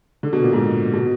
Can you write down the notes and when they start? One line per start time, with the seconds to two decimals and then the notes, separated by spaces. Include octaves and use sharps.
0.23 D3
0.33 B2
0.43 A#2
0.53 G#2 B2
0.93 B2